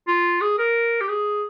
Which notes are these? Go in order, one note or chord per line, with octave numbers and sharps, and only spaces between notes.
F4
G#4
A#4
G4
G#4